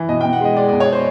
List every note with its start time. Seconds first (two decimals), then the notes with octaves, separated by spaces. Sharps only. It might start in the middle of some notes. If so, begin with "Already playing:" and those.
Already playing: E3
0.09 B2 D#5
0.21 G5
0.24 B2
0.33 F#5
0.41 G#3 D#5
0.56 G#3 D5
0.69 D5
0.73 B2
0.80 C#5
0.88 G#3 C5